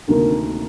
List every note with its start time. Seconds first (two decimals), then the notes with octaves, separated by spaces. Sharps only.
0.08 D2 C3 D#3 A#3